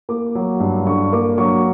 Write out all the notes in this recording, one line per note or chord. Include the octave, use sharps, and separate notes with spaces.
A#3 D6
F#3
G2
D3 C#6
A#3 D6
F#3 C#6